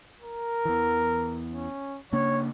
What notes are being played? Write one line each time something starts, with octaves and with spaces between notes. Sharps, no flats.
A#4
E2 E3
C#4
C#3 A#3 D4 C#5